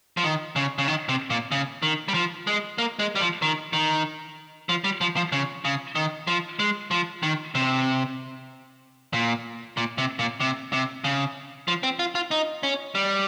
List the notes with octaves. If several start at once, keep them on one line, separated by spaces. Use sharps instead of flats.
F3
D#3
C#3
C#3
D#3
C3
A#2
C#3
D#3
G3
F3
G#3
A#3
G#3
G3
F3
D#3
D#3
F3
G3
F3
F3
C#3
C#3
D#3
F3
G#3
F3
D#3
C3
A#2
A#2
C3
A#2
C3
C3
C#3
F3
C4
F4
F4
D#4
C#4
G3